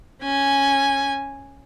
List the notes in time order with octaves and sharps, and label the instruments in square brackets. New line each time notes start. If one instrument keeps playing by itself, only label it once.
[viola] C#4 G#5